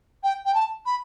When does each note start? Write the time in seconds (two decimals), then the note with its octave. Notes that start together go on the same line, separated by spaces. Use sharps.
0.23 G5
0.45 G5
0.54 A5
0.85 B5